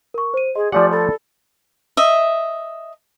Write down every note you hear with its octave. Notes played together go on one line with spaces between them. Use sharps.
A#4 C#6
C5 D#7
G#4 D#5 C6
F3 A3 G4 D5 F#5 G#5 D6
A4 D5 B5 A6
D#5 E5